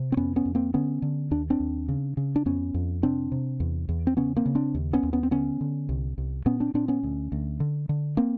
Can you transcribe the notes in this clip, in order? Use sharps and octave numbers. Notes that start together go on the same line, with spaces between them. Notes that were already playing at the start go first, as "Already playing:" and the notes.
Already playing: C3
C4
F2 B3 C#4
B3 C#4
F2
A#3 C4
D3 B3 C#4
D3
D#2 D4
C4 D4
D#2
C#3
C#3
D4
F2 B3 C#4
F2
C3 C4 D4
C3
E2
E2
C4
C#3 B3 C#4
A#3 C4
C#3
C4 D4
D#2
B3 C#4
D#2
B3 C#4
C4
D3 B3 C#4
D3
C2
C2
A#2 B3 C#4
C4 D4
A#2 C4 D4
B3 C#4
D2
D2
D3
D3
A#3 C4